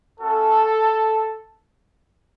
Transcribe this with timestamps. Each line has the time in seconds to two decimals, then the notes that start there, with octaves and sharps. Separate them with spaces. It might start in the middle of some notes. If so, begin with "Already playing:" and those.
0.19 A3 C#4 F#4 A4